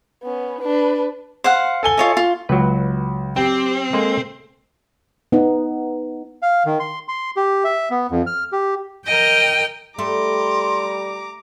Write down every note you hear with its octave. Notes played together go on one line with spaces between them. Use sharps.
B3 C#4
D4 B4
C5 F5 F#5
A4 G#5 G7
F4 C#5 D#5
F4
C#2 F#3 B4
C4 G4 G5
G#3 A#3 A4 C5
B3 D#4
F5
D#3
C6
C6
G4
E5
B3
F2
F6
G4
A#4 D#5 G5
G3 A3 A#5 C6 D6